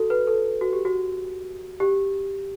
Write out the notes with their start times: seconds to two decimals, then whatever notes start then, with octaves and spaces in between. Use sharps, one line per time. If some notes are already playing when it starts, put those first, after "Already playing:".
Already playing: F#4 A4
0.10 B4
0.27 A4
0.61 F#4
0.73 G4
0.85 F#4
1.80 G4